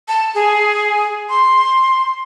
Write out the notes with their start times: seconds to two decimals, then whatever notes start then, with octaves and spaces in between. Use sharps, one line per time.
0.08 A5
0.35 G#4
1.29 C6